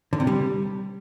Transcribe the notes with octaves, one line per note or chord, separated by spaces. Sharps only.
D3
C3
G3